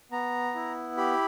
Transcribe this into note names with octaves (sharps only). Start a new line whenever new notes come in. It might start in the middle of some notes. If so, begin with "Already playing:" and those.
B3 A#5
E4
G4 B5